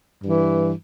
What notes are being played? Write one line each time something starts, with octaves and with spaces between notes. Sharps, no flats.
G2 E3